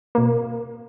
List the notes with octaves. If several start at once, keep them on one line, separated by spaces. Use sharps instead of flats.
B2 A#3